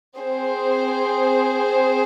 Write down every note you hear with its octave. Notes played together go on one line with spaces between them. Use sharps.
C4 G#4 C5